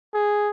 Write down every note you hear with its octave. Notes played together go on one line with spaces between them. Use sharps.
G#4